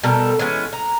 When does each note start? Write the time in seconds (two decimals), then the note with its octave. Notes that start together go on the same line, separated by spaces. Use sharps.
0.03 B2 G3 A4 A#4
0.39 E3 G#3 B3 C#4
0.73 A#5